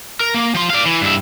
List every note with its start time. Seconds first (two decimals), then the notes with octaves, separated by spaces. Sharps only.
0.20 A#4
0.34 A#3
0.55 F3 C6
0.70 D5 F5
0.86 E3
1.01 G2 E4